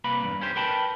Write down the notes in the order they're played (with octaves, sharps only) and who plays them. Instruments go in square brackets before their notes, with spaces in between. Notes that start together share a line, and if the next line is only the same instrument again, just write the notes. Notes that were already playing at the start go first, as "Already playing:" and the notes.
[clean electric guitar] C2 A#3 B4 B5
E2 G2
C#4 G4 C5
A#4 B4 G5 A5 B5